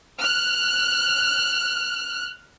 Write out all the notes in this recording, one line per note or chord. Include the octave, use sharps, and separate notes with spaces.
F6 F#6